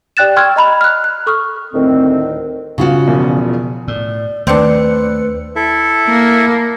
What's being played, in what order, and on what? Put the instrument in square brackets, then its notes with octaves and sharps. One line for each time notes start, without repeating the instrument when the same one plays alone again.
[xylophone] G4 D5 G5 F#6 A6 E7
G5 C6 C#6 E6 F6 G#6
D#5 A#5 B5 F7
F6 F#6
F#6
A4 C#6 D#6 F6
[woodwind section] D2 A2 D#3 C4
[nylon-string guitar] C#3 F4 F#4
[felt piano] E1 E2 F3
[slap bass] A2 [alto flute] D5
[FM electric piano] D#2 D5 C#7 [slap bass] A3 [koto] C4 D4 [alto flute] B4
[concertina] E4 A4 E5
[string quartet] A#3